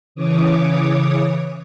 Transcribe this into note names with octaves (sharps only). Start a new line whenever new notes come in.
C#3 E3 C#5 D6 D#6